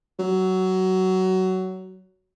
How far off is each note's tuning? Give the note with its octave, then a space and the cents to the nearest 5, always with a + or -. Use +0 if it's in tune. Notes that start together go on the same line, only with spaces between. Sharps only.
F#3 +15